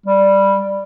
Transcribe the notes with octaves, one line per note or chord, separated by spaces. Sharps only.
G3